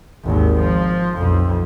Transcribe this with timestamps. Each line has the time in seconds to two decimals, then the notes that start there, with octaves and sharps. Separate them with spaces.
0.24 G#1 D#2
0.60 F3
1.17 B1 F2